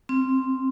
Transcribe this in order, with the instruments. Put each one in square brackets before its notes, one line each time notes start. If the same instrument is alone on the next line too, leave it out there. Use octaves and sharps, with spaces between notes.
[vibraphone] C4